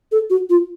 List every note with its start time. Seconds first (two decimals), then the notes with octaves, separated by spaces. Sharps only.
0.12 A4
0.30 F#4
0.50 F4